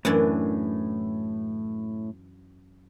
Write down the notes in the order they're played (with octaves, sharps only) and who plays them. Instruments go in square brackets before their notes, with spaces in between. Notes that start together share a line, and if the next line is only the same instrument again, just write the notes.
[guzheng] F#2 E3 D4 [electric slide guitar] A2